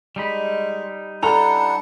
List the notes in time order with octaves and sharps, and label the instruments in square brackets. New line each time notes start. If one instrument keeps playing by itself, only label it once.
[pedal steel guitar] G3 D#4 B5 [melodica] G#3
[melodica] D4 E4 F#5 [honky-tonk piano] A4 A#5 F7